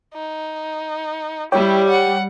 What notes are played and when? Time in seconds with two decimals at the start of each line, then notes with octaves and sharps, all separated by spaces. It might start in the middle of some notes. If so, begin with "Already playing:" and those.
0.14 D#4
1.52 G3 E4 C#5 G5 D6
1.88 F#5